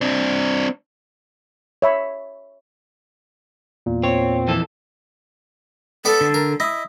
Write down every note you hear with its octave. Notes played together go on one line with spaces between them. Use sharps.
C4 D4
C#5 E5 B5
E2 A#2
C4 C#5
F2 E3 A4
B3 A4 D5 D6
D3
A#4
E4 D#5 D#6